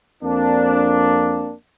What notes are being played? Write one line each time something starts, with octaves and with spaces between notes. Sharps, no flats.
F2 A#3 C4 D4